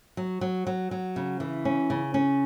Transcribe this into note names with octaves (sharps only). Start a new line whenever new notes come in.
F#3
F#3
F#3
F#3
C#3
E3
C#4
C#3
C#4